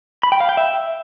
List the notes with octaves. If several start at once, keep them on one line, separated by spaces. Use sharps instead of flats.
B5
G5
F5
G5
E5